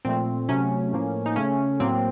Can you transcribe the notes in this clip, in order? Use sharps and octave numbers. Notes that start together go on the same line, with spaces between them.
A#2 F3 A3 C4
C3 F#3 A3 C#4
A2 F3 A#3
D#4
C#3 A3 C#4
A2 F#3 A#3 C4